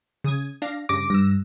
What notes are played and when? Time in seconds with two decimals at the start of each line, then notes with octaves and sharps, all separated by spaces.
0.24 C#3 D#6 G#6
0.62 D4 F5 A#6
0.89 G2 C#3 D6 A#6
1.10 G2 E6 A#6